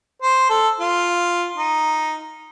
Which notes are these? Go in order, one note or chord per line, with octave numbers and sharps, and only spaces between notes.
C5
A4
F4
D#4